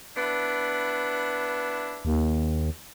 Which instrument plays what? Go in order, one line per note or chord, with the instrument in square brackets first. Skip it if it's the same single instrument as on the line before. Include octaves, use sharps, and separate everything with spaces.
[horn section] B3 D4 E4
[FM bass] D#2